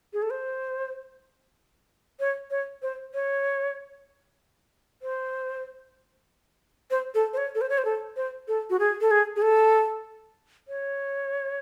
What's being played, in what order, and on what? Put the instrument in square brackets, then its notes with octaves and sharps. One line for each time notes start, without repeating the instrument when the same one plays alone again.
[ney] G#4
A4
C5
C#5
C#5
C5
C#5
C5
C5
A4
C5
C#5
A4
C5
C#5
C5
A4
C5
A4
F#4
G#4
A4
G#4
G#4
A4
C#5